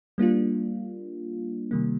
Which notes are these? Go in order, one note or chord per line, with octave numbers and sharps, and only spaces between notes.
G3 A#3 D4 F4
C3 D#3 G3 A#3